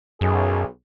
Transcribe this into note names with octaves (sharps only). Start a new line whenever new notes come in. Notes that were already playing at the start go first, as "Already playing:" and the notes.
B1 F#2 G#4